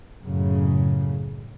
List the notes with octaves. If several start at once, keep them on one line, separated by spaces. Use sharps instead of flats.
F#2 A2 C#3